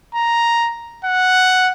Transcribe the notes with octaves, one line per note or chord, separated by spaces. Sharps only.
A#5
F#5